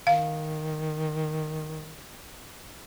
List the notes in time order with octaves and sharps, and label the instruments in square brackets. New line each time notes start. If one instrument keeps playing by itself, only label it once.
[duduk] D#3 [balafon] F5